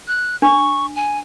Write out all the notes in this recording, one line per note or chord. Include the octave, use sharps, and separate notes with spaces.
F#6
D4 C#6
G#5